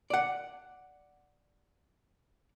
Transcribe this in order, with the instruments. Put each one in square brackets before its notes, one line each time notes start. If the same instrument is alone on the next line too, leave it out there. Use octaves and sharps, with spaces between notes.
[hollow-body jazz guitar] D5 F#5